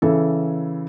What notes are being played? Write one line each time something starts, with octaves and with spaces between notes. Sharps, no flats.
C#3 E3 A4